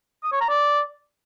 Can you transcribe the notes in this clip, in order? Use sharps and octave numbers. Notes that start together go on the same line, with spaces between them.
D#6
C#5
A#5
D5